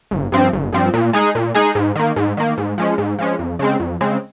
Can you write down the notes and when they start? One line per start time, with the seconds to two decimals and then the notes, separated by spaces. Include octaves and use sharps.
0.11 G1
0.32 G2 F3 C4
0.53 G1
0.72 G2 F3 C4
0.94 A#2
1.13 G#3 D#4 G#4
1.35 A#2
1.55 G#3 D#4 G#4
1.75 G#2
1.95 D#3 A#3
2.16 G#2
2.37 D#3 A#3
2.58 G#2
2.78 F3 G#3 C#4
2.98 G#2
3.19 F3 G#3 C#4
3.39 F2
3.59 C#3 G#3 C4
3.80 F2
4.01 C#3 G#3 C4